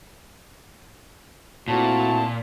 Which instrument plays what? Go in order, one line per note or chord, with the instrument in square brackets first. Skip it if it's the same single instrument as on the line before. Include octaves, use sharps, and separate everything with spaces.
[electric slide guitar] A#2 [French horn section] A3 C4 E4 [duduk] F#4 [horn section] A5